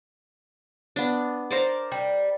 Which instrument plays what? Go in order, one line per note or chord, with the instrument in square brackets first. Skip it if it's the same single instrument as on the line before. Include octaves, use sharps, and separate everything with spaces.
[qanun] B3 D4
A#4 C5 D5
[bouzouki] G3